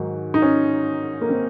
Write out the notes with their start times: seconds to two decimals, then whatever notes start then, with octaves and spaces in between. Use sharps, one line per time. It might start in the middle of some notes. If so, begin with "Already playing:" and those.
Already playing: G#2 D#3 F#3
0.34 D#4
0.42 C#4
1.21 A#3
1.29 C4